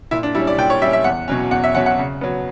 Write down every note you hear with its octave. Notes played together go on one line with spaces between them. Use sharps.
A#2 E4
D4
G3 C#4 E4
D5
A#2 G5
C#5
G3 C#4 E5
E5
E2 F#5
B2 F#3 C#4
E2 F#5
E5
B2 F#3 C#4 F#5
F#5
C#3
F#3 B3